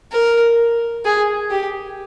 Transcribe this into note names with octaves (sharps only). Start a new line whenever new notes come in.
A#4
G#4
G4